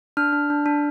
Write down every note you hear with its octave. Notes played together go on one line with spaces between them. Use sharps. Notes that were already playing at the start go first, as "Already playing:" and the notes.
D4 F6
D4
D4
D4